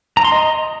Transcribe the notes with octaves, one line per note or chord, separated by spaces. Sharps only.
A#5
C6
D#5